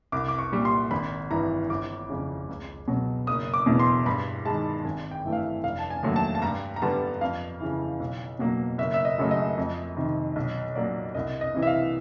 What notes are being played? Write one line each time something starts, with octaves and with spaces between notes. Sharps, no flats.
C2 D6
D6
C#6
A#2 G3
C6
G#1 B5
G2 E3 A#5
G1 D6
F2 C#3
C#2
B2 F#3
F#1 D#6
D6
E2 B2
C6
G2 B5
D#3 G#3 A5
G#1 G#5
G5
G2 E3 A3
F5
E5
F1 F5
A5
G#5
D#2 D3 F#3 A3
A5
A5
G2 A#5
A#5
D3 G3 B3 A5
F2 F5
C#3 E3
B1
B2 F#3 A#3
F#1 E5
E5
D#5
F#2 C#3 F#3 A3
D#5
F2
C3 D#3
B1 D#5
A#2 F#3 A#3 D5
C2 D#5
D#5
C3 E3
E5
F5